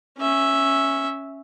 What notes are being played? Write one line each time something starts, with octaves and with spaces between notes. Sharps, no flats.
C#4 E5